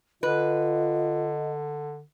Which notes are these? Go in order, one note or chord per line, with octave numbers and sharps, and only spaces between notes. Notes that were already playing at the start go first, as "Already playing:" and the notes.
D3 F4 B4 D#5